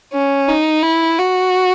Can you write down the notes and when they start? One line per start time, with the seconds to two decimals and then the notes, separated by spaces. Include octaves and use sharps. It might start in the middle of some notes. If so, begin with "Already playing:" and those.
0.13 C#4
0.48 D#4
0.83 E4
1.18 F#4